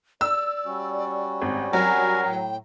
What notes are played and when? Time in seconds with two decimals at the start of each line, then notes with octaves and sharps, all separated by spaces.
0.21 D5 E6
0.65 G3 C#4 F#4
1.42 G#1
1.73 F#3 A#4 G#5
2.24 A2 G5